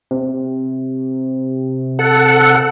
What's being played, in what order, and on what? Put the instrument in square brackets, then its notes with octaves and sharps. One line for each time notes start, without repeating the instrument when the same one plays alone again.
[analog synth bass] C3
[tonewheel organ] A4 F#5